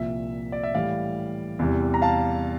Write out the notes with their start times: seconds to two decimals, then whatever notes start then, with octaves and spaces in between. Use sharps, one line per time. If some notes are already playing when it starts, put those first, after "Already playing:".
Already playing: C2 A#2 F3 A#3 E5
0.52 D5
0.63 E5
0.74 A2 E3 G3 D5 F5
1.59 E2 C3 E3 G3
1.94 A#5
2.02 F5 A5